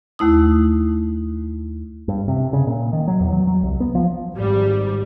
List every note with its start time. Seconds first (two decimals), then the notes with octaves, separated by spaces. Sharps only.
0.19 D#2 A3 E4 D#6
2.08 G2
2.28 C3
2.53 C#3
2.67 A#2
2.93 D#3
3.08 F#3
3.20 E2
3.33 F#3
3.47 F#3
3.63 C2
3.80 B3
3.95 F3
4.35 G#1 G3